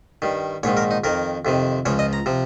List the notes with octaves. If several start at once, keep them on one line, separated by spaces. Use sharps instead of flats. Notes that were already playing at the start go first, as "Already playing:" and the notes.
G2 D#3
A#1 G#2 D#3 C#5
A#4
D#4
F2 D#3 A#4
F2 C3 D#3
C#2 C#3 F3 C#5
D#5
A#5
C3 F3